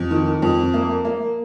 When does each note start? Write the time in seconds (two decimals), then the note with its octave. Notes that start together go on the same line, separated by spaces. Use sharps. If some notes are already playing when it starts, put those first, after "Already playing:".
Already playing: F2
0.11 D#3
0.42 F2
0.74 A#3
1.05 A#3